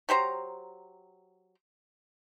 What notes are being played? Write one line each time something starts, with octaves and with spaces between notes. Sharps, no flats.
F#3 G4 C5 A#5